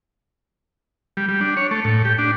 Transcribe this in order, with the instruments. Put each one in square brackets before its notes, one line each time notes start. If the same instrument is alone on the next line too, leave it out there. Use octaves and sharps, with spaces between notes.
[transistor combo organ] G3
G3
D4
C#5
A3
A2
G4
D4